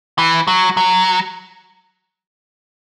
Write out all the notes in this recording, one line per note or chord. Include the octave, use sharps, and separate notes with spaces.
E3
F#3
F#3